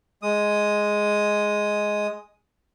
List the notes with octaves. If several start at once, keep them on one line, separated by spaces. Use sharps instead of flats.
G#3 D#6